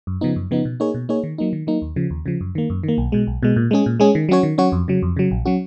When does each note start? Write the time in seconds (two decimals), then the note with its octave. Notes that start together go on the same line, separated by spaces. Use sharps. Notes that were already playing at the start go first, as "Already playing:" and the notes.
0.07 F#2
0.21 C#3 F3 B3 D#4
0.36 F#2
0.51 C#3 F3 B3 D#4
0.65 B2
0.80 A#3 D#4 G#4 C#5
0.94 B2
1.09 A#3 D#4 G#4 C#5
1.24 D#3
1.38 F#3 A#3 D#4
1.53 D#3
1.67 F#3 A#3 D#4
1.82 D#2
1.96 C#3 F3
2.10 D#2
2.26 C#3 F3
2.41 F#2
2.55 D#3 A#3
2.70 F#2
2.83 D#3 A#3
2.98 B1
3.12 B2 G#3
3.27 B1
3.43 B2 G#3
3.56 A#2
3.71 G#3 C#4 G#4
3.86 A#2
4.00 G#3 C#4 G#4
4.15 D#3
4.29 F#3 C#4 F#4 C#5
4.43 D#3
4.58 F#3 C#4 F#4 C#5
4.72 F2
4.88 C#3 F#3
5.02 F2
5.17 C#3 F#3
5.31 A#1
5.45 F#3 C#4 F#4